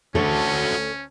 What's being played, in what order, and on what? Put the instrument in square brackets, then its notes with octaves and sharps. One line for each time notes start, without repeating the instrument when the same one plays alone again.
[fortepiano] D2 [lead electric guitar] A3 F#4 [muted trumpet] C#4 [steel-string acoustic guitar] A4 C#5